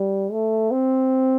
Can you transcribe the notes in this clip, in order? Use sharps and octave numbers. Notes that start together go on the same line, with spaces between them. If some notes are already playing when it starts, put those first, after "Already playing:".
Already playing: G3
A3
C4